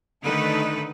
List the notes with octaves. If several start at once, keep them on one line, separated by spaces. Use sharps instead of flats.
D3 D#3 A3 D#4 A4 B4